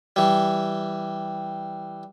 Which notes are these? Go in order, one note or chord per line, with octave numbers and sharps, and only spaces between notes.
E3 G3